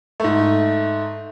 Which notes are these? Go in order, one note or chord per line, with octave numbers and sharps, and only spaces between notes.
G#2 A3